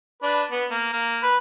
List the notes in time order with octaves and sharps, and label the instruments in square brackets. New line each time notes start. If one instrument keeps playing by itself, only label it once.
[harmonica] D4 B4
B3
A#3
A#3
B4